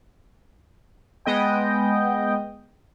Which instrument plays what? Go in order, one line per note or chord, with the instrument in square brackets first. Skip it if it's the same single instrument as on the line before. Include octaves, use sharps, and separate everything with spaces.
[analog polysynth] G#3 B3 D#5 G5